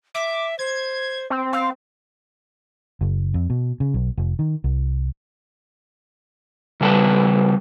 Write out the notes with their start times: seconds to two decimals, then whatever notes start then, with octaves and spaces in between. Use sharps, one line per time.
0.15 E5 D6
0.59 C5 G#6
1.30 C4
1.53 C4 F5
3.01 F#1
3.34 F2
3.50 B2
3.80 C#3
3.94 B1
4.18 F1
4.39 D#3
4.64 C2
6.81 C#3 G3 A4 B4